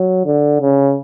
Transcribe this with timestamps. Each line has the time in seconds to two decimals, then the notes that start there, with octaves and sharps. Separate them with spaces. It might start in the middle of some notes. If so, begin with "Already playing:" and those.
Already playing: F#3
0.26 D3
0.61 C#3